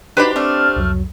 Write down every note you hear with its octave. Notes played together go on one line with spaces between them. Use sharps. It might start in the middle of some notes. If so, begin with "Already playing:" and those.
D4 D#4 F#4 G4 B4 C5 D5 B5
A3 C4 D5 A5 F6
C2 F2 F#3